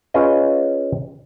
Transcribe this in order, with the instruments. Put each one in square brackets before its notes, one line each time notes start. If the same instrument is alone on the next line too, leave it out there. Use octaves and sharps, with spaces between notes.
[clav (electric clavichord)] C#4 F4 G#4 B4 D#5